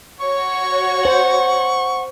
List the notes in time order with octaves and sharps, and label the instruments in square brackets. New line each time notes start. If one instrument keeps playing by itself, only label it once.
[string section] F#4 C#5 [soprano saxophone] C#6
[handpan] C5 [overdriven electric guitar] F#5